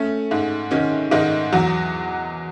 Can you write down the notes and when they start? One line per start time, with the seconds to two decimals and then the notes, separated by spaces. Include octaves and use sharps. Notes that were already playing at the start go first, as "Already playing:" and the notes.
Already playing: A3 C#4
0.31 G#2
0.71 D#3 C#4
1.11 G#2 D#3 D#4
1.52 E2 F#3 F#4